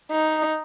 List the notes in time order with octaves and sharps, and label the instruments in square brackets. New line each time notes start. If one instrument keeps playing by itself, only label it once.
[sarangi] D#4